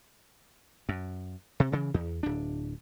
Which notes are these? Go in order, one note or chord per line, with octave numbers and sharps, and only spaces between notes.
F#2
C3
C#3 E3
E2
D1 D4